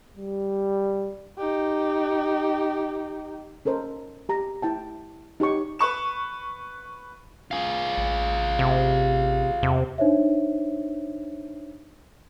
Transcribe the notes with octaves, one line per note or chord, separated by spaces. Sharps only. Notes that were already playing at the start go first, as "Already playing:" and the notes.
G3
D#4 G4
C#4 A4 A#4 C5 D#5
G4 A#5
E4 G5 A5
D#4 G4 C#5 C#6
B4 C#6 E7
F4 G#4
A1
C3
E2 C3
D4 D#4 C5 C#5 E5